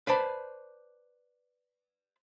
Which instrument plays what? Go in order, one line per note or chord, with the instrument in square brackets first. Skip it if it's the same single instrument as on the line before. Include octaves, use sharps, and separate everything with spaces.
[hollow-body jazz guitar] B4 C5 D5 A5 B5